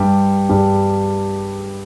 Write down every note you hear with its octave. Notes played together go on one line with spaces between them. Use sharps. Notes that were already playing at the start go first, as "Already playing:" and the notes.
Already playing: G2 G3 G4
G2 G3